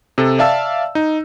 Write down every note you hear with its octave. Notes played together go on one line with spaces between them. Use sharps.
C3 A4
D5 E5 F5 A5 E6
D#4